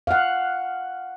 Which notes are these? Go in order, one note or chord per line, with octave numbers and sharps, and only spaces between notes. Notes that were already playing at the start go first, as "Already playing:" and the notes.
F5 F#5